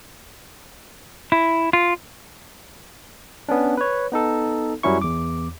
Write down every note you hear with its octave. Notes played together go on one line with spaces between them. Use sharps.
E4
F4
B3 C#4 D4
B4 C#5
B3 D#4 A4
F#2 F#3 G3 C#4 E4 C#6
E2 D6